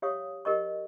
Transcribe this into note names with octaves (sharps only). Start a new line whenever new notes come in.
G4 C#5 E5 F5 C#6 D#6
G4 A#4 D#5 C#6